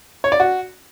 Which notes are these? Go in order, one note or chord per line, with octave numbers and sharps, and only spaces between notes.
C#5
D5
F#4